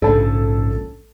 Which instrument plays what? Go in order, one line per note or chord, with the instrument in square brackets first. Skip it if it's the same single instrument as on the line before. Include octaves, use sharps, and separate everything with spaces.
[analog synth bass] A#1 [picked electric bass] G#2 C#3 [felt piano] A4 A5